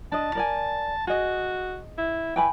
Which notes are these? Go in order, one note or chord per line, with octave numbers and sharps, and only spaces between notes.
D4 D#5 A5
A#4 D5 G#5
F#4 G#4 D#5
E4
E3 G5 G#5 B5